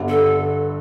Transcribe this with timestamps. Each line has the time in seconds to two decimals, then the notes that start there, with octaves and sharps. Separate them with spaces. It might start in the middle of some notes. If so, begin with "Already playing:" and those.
Already playing: G1 G2 D3
0.09 A4